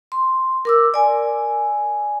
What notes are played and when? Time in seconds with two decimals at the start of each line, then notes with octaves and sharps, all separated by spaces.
0.12 C6
0.65 A#4 D6 E6
0.94 D5 G#5